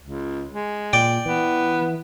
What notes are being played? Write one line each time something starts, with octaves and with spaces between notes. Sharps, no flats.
C#2
G#3
A#2 D5 G5
E3 B3